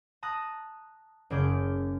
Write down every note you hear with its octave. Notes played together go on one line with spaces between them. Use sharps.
A5 A#5 D#6 F#6
F#1 C#3 G#4 D6 G6